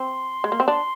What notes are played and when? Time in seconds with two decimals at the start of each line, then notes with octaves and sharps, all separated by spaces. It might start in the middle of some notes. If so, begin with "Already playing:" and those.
Already playing: C4 C6
0.44 G#3
0.52 A#3
0.60 C4
0.68 D4 C6